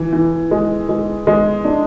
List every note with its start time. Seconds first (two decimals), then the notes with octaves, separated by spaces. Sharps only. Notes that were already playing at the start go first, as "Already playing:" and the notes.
Already playing: E3
0.13 E3
0.51 G#3
0.89 G#3
1.27 G#3
1.65 D4